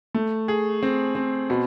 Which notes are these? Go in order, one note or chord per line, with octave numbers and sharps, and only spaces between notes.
A3
G#4
C4
C4
B2